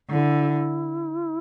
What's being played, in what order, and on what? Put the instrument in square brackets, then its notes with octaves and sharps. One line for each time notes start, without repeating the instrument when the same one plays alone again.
[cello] D3 [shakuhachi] E4